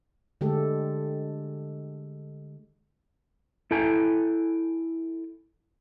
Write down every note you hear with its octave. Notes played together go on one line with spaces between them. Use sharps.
D3 G#3 A3 G4 A4
E4 A4 G5 G#5